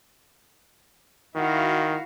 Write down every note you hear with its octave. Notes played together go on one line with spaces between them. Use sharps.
D#3 E4 F#4 F5